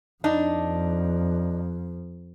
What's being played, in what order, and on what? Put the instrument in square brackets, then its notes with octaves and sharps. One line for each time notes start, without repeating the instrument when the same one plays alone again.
[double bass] F2 [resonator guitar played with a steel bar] D4 D#4